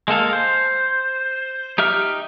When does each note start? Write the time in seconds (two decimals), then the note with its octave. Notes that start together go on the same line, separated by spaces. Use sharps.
0.08 G#3 A#3 A4 F5
0.33 C5
1.78 D#4 G4 E5 F6